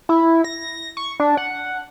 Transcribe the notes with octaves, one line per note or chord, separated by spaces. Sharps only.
E4
A#6
C#6
D4
F#5